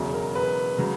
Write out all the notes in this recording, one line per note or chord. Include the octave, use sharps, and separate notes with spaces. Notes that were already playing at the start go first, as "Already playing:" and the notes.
Already playing: E1 E2 C#3 F#3
A#4
B4
C#3 F#3